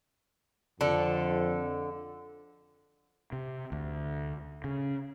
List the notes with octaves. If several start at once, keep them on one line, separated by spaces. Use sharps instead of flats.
F2 D3 A4
C3
D2
C#3